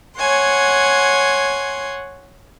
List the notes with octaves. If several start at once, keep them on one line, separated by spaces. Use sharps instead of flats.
C#5 F#5 G#5 C6